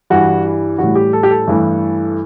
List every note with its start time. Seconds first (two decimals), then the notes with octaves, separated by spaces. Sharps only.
0.10 G2 E3 G3 F#4
0.78 A2 E3 G3 F#4
0.96 G4
1.13 A4
1.23 G4
1.31 A4
1.48 G2 E3 A3